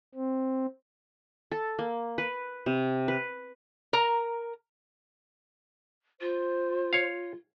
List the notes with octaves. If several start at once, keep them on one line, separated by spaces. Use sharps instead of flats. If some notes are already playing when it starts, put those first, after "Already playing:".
C4
A4
A#3
B4
C3
B4
A#4 A#5
F4 C5
C#5 F5